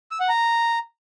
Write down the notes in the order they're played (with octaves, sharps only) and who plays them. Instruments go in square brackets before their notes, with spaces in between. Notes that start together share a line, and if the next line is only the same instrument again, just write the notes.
[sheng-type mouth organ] E6
F#5
A#5